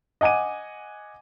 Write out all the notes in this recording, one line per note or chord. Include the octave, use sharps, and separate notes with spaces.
D#5 F#5 G#5 D6 D#7